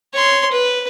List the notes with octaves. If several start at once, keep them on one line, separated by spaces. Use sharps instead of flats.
C#5 C6
B4